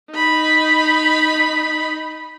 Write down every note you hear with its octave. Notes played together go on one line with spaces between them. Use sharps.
D#4 B5